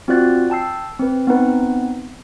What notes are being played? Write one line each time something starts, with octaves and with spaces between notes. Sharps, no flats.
C4 F4 F#4 D5 F#6 A6
G5 A5 E6 C7
C4 B4
B3 C4 D#4 B4